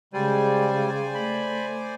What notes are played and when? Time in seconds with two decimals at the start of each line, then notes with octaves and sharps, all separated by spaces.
0.13 C#3 G3 G#3 C5 D5 G#5
1.15 A3 B5